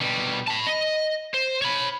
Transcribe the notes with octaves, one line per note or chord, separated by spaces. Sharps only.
B2 G3
A5 B5
D#5
C5
C#5 B5